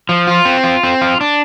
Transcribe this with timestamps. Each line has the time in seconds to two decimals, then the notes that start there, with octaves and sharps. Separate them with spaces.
0.09 F3
0.27 F4
0.45 C4
0.64 F4
0.83 C4
1.01 F4
1.21 D4